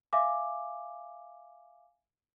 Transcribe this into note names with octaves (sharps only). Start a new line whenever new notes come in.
E5 F5 G#5 D6